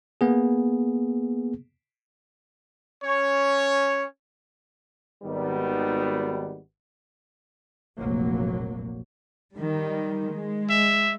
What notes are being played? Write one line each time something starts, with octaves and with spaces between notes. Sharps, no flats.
A#3 B3 G#4
C#4 C#5
G#1 D#3 G3 B3
F1 A#1 F#3 A#3
D#3 G3
G#3
E5